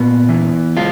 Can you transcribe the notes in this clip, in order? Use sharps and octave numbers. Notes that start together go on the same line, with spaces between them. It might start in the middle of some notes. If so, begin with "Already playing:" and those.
Already playing: A#2 B3 F4
E3
G#3 F4